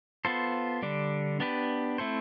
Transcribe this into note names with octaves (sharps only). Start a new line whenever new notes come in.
B3 F4 A4 C5
D3 G3 D4
B3 D4 G4 B4
A3 C4 E4 A4 C5